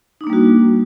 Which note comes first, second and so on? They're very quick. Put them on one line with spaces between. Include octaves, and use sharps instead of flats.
D#4 D4 A#3 G3 F#4